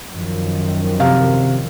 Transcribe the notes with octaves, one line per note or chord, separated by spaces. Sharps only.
F#2 D#3 F3
C3 F5